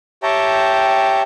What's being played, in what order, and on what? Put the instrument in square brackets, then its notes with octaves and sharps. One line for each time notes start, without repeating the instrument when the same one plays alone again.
[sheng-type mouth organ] G4 C#5 E5 G5 A5 A#5